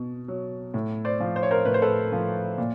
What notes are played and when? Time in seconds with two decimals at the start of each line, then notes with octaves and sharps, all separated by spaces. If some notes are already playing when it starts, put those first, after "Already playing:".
Already playing: B2
0.28 F#3
0.74 A2
1.05 C5 D5
1.20 F3
1.36 C5
1.43 C#5
1.51 A#4 C5
1.65 A2 B4
1.74 C5
1.82 A4 B4
2.12 F3
2.58 A#2